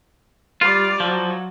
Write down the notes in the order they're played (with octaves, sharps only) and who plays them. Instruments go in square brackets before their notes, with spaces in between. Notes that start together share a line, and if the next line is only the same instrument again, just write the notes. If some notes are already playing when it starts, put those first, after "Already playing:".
[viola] G3 D5 [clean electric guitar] F4
[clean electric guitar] F3 [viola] F#3